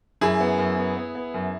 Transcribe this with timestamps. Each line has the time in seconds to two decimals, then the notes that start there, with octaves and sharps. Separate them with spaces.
0.21 F#2 E4 G#4
0.40 B3
0.58 F#2
0.77 B3
0.97 B3
1.15 B3
1.34 F#2